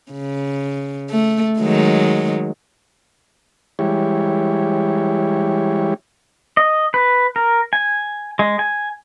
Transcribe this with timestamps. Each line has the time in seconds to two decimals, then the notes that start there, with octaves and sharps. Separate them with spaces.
0.12 C#3
1.10 A3
1.59 D#3 F#3 G#3
3.79 E3 G3 G#3 E4 G4 C#5
6.57 D#5
6.94 B4
7.36 A#4
7.73 G#5
8.39 G#3
8.59 G#5